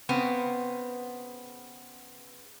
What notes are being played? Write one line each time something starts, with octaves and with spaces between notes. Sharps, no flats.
C#3 B3 C4